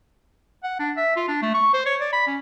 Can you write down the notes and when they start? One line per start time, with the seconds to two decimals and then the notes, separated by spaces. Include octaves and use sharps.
0.64 F#5
0.79 D4
0.97 E5
1.16 F4
1.28 D4
1.42 A3
1.54 C#6
1.74 C5
1.86 C#5
2.00 D5
2.13 B5
2.27 C#4